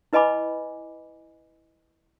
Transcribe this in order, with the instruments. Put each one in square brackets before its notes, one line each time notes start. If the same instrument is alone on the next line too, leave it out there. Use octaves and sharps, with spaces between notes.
[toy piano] E4 B4 D#5 G#5 B5 D6